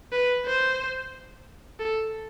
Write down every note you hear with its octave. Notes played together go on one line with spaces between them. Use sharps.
B4
C5
A4